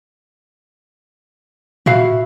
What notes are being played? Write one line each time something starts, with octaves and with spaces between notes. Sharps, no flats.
A#2 E4 F#4 F5